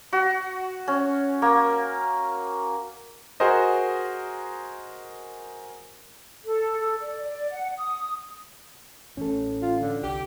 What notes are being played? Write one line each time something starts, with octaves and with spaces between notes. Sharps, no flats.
F#4
C#4
A#3
F#4 G#4 A#4 C5 D#5
A4
A4
D5
D5
F#5
D#6
A2 E3 C#4 A4
F4
D3
C2 G4